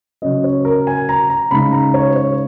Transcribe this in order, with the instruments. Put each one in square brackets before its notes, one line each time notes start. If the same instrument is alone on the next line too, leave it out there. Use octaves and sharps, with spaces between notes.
[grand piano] C#3 F#3 C#4 D#5
C#5
A#4
G#5
A#5
A#5
C#3 G#3 D#4 B5
A#5
C#5
C#5